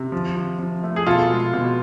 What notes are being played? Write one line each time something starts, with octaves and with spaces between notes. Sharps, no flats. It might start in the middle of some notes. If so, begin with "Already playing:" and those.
Already playing: C3
F3
F3
F3
A3
G#4
B2 F4 A4
G#3
B2